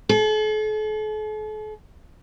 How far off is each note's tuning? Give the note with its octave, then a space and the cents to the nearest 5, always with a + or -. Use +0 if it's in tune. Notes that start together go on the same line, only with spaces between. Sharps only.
A4 -45